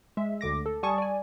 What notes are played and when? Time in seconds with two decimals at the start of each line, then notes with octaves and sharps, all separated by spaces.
0.17 G#3 E5
0.41 D2 D3 D6 A#6
0.66 A4
0.83 G3 G#5 A5 C#6 D#6
0.98 D5 G#5